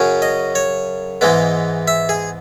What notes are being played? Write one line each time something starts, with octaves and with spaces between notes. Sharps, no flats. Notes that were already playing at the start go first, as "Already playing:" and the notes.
Already playing: F#2 C#3 F#3 C#4
D#5
C#5
G#2 E3 G#3 B3
E5
G#4